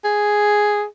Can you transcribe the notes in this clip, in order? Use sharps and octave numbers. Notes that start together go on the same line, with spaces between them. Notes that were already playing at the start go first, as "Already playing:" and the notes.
G#4